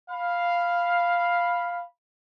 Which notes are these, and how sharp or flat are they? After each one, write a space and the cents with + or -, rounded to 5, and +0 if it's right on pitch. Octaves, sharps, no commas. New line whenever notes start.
F5 +0 B5 +0